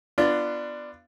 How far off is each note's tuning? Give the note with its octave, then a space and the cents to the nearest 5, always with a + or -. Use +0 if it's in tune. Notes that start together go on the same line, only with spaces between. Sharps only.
B3 +0 D4 +10 F4 -20